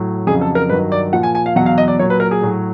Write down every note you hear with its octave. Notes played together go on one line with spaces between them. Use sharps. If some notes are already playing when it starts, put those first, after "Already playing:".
Already playing: A2 F#3
F2 C#3 F#3 G#4
A4
A#4
G2 D#3 F#3 B4
D5
A#2 F3 F#5
G#5
G#5
F5
E2 B2 F#3 F#5
F5
D#5
D5
A#2 F#3 C#5
B4
A#4
G#4
A2 F#3